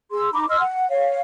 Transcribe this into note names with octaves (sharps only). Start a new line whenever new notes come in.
G#4 C6 E6
D#4 A#5 B5 D6
D#5 C6 E6 F6
F#5
C#5 F5